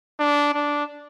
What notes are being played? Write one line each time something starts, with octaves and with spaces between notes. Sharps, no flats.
D4
D4